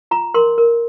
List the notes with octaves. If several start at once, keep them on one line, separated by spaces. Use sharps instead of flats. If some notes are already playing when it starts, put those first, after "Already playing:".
F4 A#5
A#4 C6
A#4